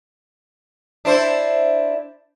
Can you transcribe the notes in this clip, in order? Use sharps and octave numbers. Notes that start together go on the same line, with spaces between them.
D4 E4 C5